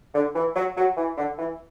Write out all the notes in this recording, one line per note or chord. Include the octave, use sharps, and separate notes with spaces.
D3
E3
F#3
F#3
E3
D3
E3